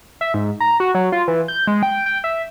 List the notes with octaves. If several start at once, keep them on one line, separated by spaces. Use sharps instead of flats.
E5
G#2
A#5
F#4
F#3
F4
E3
G6
G#3
G5
G5
E5